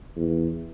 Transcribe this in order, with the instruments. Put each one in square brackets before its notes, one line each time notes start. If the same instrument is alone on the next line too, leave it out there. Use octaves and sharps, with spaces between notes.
[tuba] E2